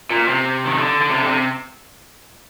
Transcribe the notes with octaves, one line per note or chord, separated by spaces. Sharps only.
A#2
C3
D#3
D3
D3
C3
D3
C3